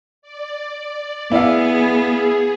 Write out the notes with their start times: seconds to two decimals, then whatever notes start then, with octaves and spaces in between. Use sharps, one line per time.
0.22 D5
1.32 B3 E4 G#4 D5 F5